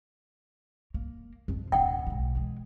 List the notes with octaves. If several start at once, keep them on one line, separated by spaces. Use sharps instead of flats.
A#3
F2 F3
D1 D4 F#5 G5
B1 G#3
E3 G#3